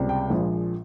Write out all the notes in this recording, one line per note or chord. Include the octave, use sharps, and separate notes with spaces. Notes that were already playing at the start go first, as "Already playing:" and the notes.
Already playing: C#2 C3 G3
G5
A#1 A#2 F3 G#3